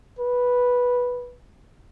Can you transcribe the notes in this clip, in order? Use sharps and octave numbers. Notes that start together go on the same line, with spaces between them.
B4